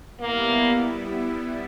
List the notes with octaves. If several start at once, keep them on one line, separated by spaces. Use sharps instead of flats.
G3 A#3 B3 E4